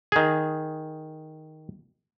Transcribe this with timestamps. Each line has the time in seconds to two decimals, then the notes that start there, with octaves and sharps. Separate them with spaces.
0.12 D#3 G#4